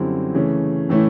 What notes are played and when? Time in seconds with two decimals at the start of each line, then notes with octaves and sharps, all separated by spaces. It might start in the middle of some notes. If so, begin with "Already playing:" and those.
Already playing: F#2 D3 G3 C4 E4
0.34 C#3 E3 A3 C#4
0.89 A2 E3 A3 C#4 E4